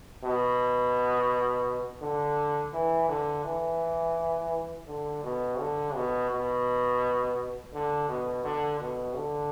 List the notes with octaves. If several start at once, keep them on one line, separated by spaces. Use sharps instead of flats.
B2
D3
E3
D3
E3
D3
B2
D3
B2
B2
D3
B2
D3
B2
D3